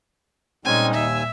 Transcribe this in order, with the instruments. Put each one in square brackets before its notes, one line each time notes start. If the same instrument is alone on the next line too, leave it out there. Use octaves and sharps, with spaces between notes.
[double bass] A#2 G3 [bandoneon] G#3 C4 C#4 [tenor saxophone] D#4 [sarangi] G#5
[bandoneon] D#2 G#5 E6 [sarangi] E5